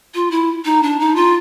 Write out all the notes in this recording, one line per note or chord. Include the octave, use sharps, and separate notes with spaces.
F4
E4
D#4
D4
D#4
F4